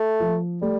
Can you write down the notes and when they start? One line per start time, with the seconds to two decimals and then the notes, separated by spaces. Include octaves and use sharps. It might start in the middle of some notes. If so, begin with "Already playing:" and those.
Already playing: A3
0.20 F3
0.62 G3 A3